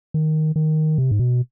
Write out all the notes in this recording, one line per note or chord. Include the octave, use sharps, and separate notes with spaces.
D#3
D#3
C3
G#2
B2